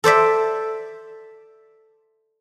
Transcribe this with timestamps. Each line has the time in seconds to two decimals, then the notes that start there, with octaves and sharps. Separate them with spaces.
0.04 A4 C5 D5 E5